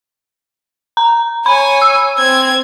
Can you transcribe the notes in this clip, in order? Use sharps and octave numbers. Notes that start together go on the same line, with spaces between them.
A#5
C#5 G#5 B5
E6
C4 G#6